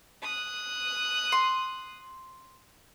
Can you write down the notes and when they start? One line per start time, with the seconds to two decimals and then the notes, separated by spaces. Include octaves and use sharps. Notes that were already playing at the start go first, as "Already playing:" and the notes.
0.23 D#6 F#6
1.32 C6